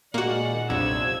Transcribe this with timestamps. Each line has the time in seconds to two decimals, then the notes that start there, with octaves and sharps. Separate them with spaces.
0.14 A#2 D#3 G#3 A#3 F#4 D5 F#5
0.70 B1 F2 C3 D4 F4 E6 G#6